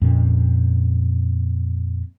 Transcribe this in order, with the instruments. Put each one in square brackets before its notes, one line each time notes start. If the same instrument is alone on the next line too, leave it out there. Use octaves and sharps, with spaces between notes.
[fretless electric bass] F2 A#2 C#4